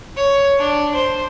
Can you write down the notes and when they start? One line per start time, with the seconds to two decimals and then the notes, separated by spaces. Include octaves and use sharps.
0.16 C#5
0.59 D4
0.95 C5